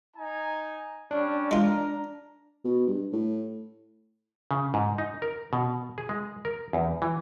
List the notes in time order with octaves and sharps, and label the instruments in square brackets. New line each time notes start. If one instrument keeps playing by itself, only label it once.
[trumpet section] D#4 G#5
[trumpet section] G3 C#4 [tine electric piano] D4
[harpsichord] G#3 F4 [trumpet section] A#4 A#5
[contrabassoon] B2
G2
A2
[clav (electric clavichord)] C#3
G#2
D#4
A#4
B2
G#4
G#3
A#4
E2
E3